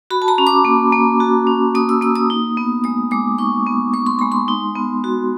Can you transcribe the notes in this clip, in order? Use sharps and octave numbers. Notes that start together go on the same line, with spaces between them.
F#4 B5
A5
A#5
C#4
D6
A#3
A#3
F#4
C#4
A#3 D#6
E6
A#3 E6
D#6
D#4
B3
G#3 D#6
G#3 D6
D#4 C#6
B3
G#3 C#6
C6
G#3 B5
C6
D#4
B3
F#4